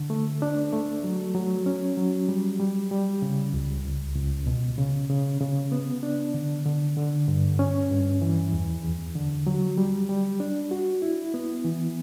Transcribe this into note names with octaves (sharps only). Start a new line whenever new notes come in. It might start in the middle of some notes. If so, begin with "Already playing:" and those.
Already playing: D3
A3
D4
A3
F#3
F#3
C#4
F#3
G3
G3
G3
C#3
C#2
C#2
C#2
B2
C#3
C#3
C#3
B3
D4
D3
D3
D3
G2
C#4
G2
E3
E2
E2
D3
F#3
G3
G3
D4
F#4
E4
B3
E3